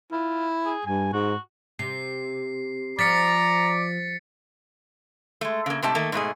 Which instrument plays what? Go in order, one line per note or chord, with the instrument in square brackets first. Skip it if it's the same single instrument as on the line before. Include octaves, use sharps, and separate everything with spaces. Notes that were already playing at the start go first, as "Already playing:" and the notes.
[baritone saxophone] E4 [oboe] F4
[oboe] G#4
[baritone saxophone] G2 [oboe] G#5
[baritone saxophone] G#2 [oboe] F#4
[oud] C3 [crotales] C7
[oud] F3 [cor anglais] D5 [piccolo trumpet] A#5 [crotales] A6 B6 C#7
[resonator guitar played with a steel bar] G#3 A3
C#3 A#3
G#2 C3 A3 G4 A5
D#3 A3 A#3
G#2 B2 A3 G#4